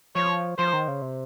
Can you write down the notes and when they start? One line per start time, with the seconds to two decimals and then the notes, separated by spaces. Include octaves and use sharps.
0.16 F3 C#5
0.58 F3 C5
0.73 D#3
0.88 C#3
1.02 C3